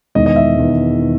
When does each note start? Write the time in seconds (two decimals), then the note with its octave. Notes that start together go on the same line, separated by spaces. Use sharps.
0.15 E1 E2 D#3 D#5
0.26 D#5
0.36 E5
0.57 E1 E2 D#3
0.99 D#3